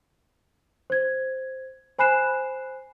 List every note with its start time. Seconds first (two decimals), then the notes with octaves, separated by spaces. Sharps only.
0.90 C5 G#6
1.98 C5 G#5 B5 F#6 C7 E7